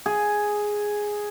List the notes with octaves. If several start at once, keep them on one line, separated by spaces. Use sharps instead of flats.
G#4